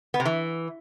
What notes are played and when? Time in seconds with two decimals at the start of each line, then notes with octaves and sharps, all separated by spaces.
0.14 B3
0.20 C3
0.25 E3